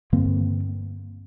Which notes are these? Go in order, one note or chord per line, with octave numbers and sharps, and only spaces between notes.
G2 D3 A#3 C4